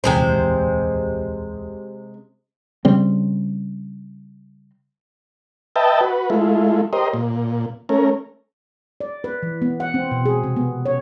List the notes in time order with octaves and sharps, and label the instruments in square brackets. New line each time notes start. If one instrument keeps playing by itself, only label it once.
[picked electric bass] D1 A#1 E2 [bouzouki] C3 G#3 C5
[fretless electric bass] C#3 G3 C4
[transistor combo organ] B4 D#5 E5 G5 A5
F#4 B4
G#3 A3 E4 F4
G4 A#4 C5 D#5
A#2
A3 C#4 A#4
[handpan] D5
B4
E3
B3
F#5
C4
B2
G#4
C3
B3
C#5